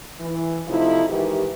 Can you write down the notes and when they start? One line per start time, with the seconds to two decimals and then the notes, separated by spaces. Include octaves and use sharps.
0.20 E3
0.68 C3 F3 A3 D#4 E4
1.09 G#2 D#3 E3 G4